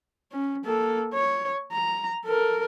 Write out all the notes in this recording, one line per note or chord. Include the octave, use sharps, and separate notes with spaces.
C#4
A#3 A4
C#5
A#5
A4 A#4